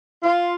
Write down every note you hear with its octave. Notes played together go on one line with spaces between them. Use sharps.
F4